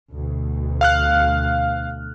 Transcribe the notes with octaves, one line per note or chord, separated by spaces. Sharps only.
D2 B2
F5 F6 F#6